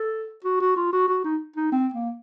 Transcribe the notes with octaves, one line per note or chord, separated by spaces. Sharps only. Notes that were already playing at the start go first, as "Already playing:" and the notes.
Already playing: A4
F#4
F#4
F4
F#4
F#4
D#4
D#4
C4
A#3